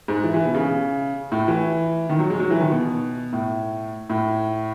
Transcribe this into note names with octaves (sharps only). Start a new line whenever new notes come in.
G#2
E3
E3
B2
C#3
A2
E3
D#3
F#3
G#3
F#3
E3
D#3
B2
A2
A2